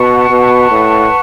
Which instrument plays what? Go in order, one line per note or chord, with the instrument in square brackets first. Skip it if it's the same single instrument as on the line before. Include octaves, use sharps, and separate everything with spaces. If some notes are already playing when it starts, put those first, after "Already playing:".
Already playing: [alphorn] B2 [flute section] B4 F#5 A5 C#6
[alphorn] B2
A2